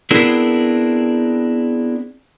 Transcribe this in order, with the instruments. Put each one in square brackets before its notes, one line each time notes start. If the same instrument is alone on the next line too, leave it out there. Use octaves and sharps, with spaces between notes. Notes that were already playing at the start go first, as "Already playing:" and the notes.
[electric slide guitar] B3 C4 D4 E4 G#4 A#4